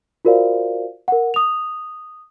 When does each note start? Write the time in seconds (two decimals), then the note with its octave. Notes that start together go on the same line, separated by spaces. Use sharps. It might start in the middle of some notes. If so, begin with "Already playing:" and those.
0.25 F4 F#4 A#4 C5 D5 F5
1.08 A#4 F#5
1.34 D#6 F7